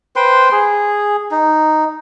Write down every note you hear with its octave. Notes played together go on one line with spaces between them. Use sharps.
B4 C5 G5 C6
G#4
D#4